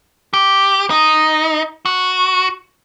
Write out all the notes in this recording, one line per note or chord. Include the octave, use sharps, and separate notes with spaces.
G4
D#4
F#4